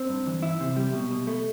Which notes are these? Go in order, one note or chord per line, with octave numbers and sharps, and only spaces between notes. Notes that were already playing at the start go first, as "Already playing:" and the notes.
Already playing: C4
G2
E3
E4
C3
G3
B2
B2
A3